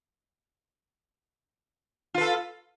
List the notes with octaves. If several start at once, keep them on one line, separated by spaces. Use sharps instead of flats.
F4 A4 B4